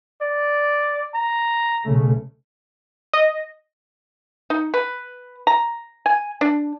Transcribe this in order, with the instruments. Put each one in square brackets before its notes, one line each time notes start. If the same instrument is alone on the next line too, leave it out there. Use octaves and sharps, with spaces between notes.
[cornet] D5
A#5
[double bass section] B1 C#3 A3
[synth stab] D#5
[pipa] D#4
B4
A#5
G#5
D4